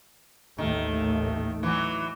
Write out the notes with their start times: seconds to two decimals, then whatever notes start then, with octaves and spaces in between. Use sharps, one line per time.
0.58 A1 D#2 D#3 A3
1.63 E3 F#3